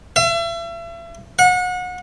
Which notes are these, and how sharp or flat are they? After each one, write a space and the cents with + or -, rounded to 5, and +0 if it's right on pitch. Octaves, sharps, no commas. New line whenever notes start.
E5 +40
F#5 -30